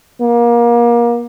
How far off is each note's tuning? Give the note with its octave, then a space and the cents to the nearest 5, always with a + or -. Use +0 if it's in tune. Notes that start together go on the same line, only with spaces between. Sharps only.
A#3 +25